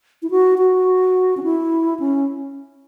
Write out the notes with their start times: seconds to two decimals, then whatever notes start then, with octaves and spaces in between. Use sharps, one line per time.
0.22 E4
0.30 F#4
0.58 F#4
1.37 C#4
1.43 E4
2.00 C#4